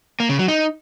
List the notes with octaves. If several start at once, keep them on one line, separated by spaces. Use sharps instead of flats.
A#3
C#3
F#3
D#4